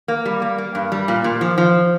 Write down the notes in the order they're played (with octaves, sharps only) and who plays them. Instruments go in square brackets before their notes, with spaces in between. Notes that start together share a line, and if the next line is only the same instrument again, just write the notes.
[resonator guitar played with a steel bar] A#3
G3
A#3
A#3
G2
G3
A#2
A#2
F3
F3